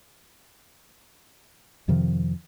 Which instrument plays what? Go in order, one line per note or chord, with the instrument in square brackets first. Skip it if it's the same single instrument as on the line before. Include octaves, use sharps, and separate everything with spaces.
[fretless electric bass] F2 C3 D#3 F3